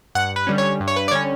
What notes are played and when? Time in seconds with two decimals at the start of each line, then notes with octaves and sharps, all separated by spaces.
0.15 G2 F#5
0.36 B4
0.47 D3 G3 C#4
0.58 C#5
0.80 G2
0.88 C#5
0.96 B4
1.08 D5
1.11 D3 G3 C#4 C#5